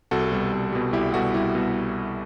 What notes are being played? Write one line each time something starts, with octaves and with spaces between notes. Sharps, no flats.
C2 F#4 A4
B2 G3
C2
B2 G3
C2 E4 G4
B2 G3 F#4 A4
C2 E4 G4
B2 G3